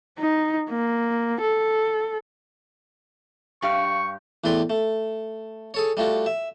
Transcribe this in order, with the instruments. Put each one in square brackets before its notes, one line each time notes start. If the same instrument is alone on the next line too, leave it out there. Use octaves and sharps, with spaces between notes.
[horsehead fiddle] D#4
A#3
A4
[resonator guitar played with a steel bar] G2 G4 F5 [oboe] C#6
[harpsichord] E2 A2 B4 D5 C6
A3
G#4 A4 C#5
G3 A3 F4 F#4
E5